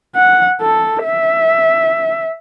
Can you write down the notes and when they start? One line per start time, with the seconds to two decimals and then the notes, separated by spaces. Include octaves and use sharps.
0.16 F#5
0.61 A4
1.04 E5